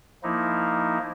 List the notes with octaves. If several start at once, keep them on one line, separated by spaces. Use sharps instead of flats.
F3 A#3 D#4 E4